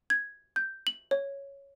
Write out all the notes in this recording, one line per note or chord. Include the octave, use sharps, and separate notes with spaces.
G#6
G6
F#7
C#5